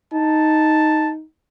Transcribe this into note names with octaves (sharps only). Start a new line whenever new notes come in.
D#4 A5